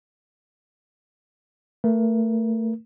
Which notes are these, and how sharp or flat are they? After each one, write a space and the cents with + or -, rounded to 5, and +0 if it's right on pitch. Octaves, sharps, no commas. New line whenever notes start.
A3 +25 A#4 +30